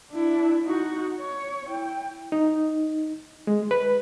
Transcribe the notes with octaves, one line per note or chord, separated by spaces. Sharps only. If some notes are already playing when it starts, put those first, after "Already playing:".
D4 E4
D#4 F#4
C#5
E4 G5
D#4
G#3
B4